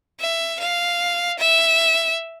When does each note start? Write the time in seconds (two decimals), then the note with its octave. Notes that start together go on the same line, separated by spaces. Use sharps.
0.20 E5
0.60 F5
1.40 E5